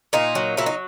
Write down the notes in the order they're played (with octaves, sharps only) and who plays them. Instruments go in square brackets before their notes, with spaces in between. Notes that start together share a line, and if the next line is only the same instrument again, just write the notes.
[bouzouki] A#2 D#4
F#3
F#3 E4
D#4